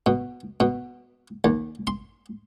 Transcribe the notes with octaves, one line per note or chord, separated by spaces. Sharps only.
B2
B2
D#2
C6